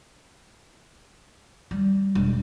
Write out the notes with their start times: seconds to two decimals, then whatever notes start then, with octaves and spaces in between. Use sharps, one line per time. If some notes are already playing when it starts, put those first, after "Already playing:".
1.71 G3
2.15 E1